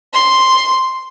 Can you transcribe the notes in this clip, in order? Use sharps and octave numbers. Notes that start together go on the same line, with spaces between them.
C6